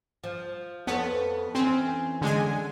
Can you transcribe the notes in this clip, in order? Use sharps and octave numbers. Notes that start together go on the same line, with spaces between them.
F3
F2 B3 A4 C#5
E3 C4 C#4
D3 G#3 G#5